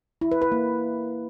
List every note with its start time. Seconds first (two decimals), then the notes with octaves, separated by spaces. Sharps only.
0.21 E4
0.32 B4
0.42 B4
0.52 A#3